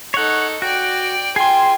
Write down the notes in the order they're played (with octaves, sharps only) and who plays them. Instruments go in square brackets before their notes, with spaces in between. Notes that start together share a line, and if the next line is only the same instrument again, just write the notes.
[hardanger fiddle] D#4 A4 [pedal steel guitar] C#5 F#5
[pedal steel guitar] F#4 [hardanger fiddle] D5 G5
[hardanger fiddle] F4 G#5 [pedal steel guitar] G#4 C6 [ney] G5